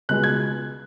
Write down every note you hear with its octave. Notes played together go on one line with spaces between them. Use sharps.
C#2 B2 G#3 F#6
G#6